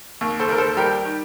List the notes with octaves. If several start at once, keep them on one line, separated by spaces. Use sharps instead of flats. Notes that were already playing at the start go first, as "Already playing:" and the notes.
D#2
A4 C5
D#2 A#4
A4 C5
G3 G4 A#4
D#3